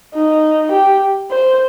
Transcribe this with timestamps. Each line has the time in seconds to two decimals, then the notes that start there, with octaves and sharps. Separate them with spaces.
0.15 D#4
0.72 G4
1.31 C5